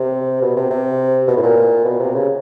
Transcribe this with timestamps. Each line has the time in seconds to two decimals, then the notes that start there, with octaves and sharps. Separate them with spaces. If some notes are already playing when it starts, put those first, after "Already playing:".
Already playing: C3
0.42 B2
0.56 C3
0.70 C3
1.27 B2
1.37 A2
1.42 A#2
1.85 B2
1.99 C3
2.14 C#3